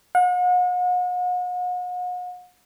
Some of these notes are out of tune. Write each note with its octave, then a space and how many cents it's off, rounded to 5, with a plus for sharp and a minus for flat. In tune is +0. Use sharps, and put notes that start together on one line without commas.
F#5 -40